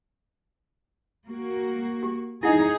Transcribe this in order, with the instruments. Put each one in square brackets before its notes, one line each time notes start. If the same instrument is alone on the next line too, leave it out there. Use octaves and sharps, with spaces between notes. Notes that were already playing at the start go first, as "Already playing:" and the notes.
[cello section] A#3 F#4
[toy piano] G4
[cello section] D#4 G#4 [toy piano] E4 F#5